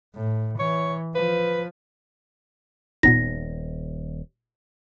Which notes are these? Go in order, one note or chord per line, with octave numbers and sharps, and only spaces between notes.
A2
E3 C#5
F3 B4
D#1 A#2 B3 D#4 A#6